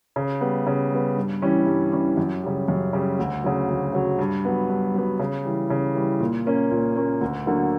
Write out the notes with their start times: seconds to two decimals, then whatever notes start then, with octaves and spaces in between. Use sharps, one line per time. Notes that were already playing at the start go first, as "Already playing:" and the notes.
0.16 C#3
0.41 G3 B3
0.67 C#3
0.91 G3 B3
1.16 G2
1.42 E3 G3 C#4
1.67 G2
1.92 E3 G3 C#4
2.17 F#2
2.43 C#3 G3
2.68 F#2
2.93 C#3 G3
3.19 D2
3.44 C#3 F#3
3.69 D2
3.93 C#3 F#3
4.19 G2
4.45 F#3 B3
4.69 G2
4.94 F#3 B3
5.19 C#3
5.45 E3 G3
5.70 C#3
5.95 E3 G3
6.20 A#2
6.46 A#3 C#4
6.71 A#2
6.96 A#3 C#4
7.21 D2
7.46 D3 F#3 A#3